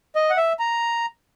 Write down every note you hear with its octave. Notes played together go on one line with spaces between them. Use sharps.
D#5
F#5
E5
A#5